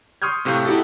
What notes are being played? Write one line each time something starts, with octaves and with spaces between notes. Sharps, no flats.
C6 C#6 D#6 F6 G6 G#6
A2 C3 A3 F5 C#6 G6
D#4 E4 F#4 G4 A4